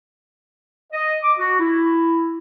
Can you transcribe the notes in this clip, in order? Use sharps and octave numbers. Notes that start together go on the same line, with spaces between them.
D#5
D6
F#4
E4